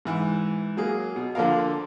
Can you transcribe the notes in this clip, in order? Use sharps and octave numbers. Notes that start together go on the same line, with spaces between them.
G#2 E3
F#3 A#3 G#4
B2
D3 F3 A#3 F4 A#4 F5